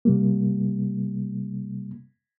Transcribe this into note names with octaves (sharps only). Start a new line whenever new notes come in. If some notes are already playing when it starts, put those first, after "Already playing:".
C3 G3 A#3